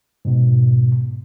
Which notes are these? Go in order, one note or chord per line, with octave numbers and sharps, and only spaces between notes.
G#2 B2